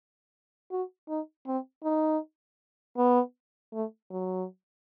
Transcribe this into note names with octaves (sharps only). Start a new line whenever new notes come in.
F#4
D#4
C4
D#4
B3
A3
F#3